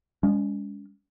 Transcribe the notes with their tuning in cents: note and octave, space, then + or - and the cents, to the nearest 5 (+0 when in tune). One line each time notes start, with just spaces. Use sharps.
G#3 -30 C#4 +35